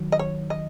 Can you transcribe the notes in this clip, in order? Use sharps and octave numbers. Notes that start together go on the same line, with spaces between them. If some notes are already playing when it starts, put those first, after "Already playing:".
Already playing: D#3 F#3
D#5
C#5
D#5